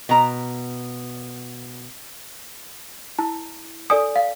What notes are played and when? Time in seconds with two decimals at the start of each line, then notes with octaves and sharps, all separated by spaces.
0.09 B2 A#5
3.19 E4 A5
3.90 A4 D5 G#5 D#6
4.16 F5